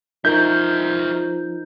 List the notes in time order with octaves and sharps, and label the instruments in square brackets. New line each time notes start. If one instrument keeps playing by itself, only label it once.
[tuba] F3 [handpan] D#4 A#4 [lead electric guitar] F#4 E5 [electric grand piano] G6